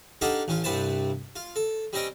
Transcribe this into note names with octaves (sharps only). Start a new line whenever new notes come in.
D4 D#4 G4 A4 F5 F#5
A1 C#4 F4
C2 G2 C3 B4 C5 A5
F4
A4
G3 C4 C#4 D#5 G5